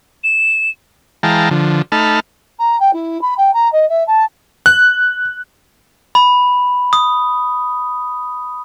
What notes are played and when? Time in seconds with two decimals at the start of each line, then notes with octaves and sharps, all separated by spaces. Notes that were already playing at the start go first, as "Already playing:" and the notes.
0.24 E7
1.23 E3 G#3 F5 G5 A5 A#5
1.51 D3 F3
1.92 A3 D#4 A5 B5 F6
2.59 A#5
2.80 G5
2.93 E4
3.21 B5
3.37 G5
3.53 A#5
3.72 D#5
3.89 E5
4.07 A5
4.66 F#6
6.15 B5
6.93 D#6